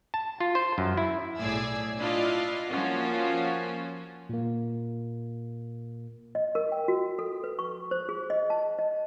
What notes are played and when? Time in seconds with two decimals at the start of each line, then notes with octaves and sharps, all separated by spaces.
0.14 A5
0.40 F4
0.55 C5
0.78 F#2
0.97 E4
1.40 B1 A2 G#4 D5 E6 G#6
1.99 D4 E4 F4 D5 D#5 F5
2.69 F3 A#3 C#4 F4 F#4
4.29 A#2 A#3
6.35 D#5
6.55 A#4
6.72 G5
6.88 F#4
7.19 A4
7.44 B4
7.59 C#6
7.91 C5
8.09 G#4
8.30 D#5
8.50 A5
8.79 D#5